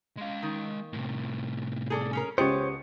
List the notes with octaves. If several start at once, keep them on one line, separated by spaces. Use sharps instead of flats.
G#3 F5
D#3
A2 C3
G#4 A4 D5
C#4 G#4 A#4
C#2 B3 G4 C5 C#5 C#7